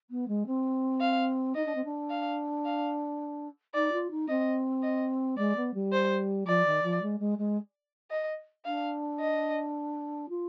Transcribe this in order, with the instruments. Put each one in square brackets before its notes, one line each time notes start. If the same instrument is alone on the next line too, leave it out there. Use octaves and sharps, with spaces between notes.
[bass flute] B3
G#3
C4
[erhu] F5
[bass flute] D#4 [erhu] D#5
[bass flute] D4
C4
D4
[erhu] F5
F5
[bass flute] D#4 [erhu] D5
[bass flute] F4
D#4
[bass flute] C4 [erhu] D#5
[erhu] D#5
[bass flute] G#3 [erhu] D5
[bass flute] B3
G3
[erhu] C5
[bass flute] F3 [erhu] D5
[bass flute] D#3
F3
G#3
G#3
G#3
[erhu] D#5
[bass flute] D4 [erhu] F5
[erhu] D#5
[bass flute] F4